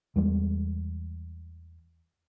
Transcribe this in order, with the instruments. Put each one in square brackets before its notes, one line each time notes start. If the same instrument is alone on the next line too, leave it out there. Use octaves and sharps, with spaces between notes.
[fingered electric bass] E2 G3 G#3